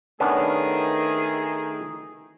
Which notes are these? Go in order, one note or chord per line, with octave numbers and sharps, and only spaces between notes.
D#3 A3 B3 C#4 D4 G#4